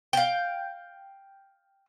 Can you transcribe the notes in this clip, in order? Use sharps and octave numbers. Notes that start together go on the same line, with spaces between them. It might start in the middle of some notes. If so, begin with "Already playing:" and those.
F5 G5